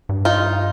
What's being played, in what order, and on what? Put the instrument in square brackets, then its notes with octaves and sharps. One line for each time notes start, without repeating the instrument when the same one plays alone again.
[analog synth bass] G2
[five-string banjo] D#4 F4